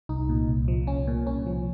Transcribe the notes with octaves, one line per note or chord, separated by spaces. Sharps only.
C2 D#4
A#2
C2
F3
C2 C#4
A#2
C2 C#4
F3